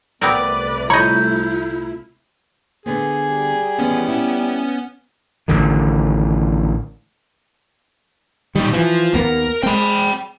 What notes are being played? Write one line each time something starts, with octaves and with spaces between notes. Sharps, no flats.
C2 C3 A3 B3 C4 A#4 B4 D5
E4 F4 C#5 D#5 A#5 B5 G6
D3 B3 C4 G#4
G3
D#2 E3 B3 C#4
E4
A1 D3 D#3
A#2 D#3 G3
E3 F3
D#2 A#3 B3 A#4
G#3 C4 G5 B5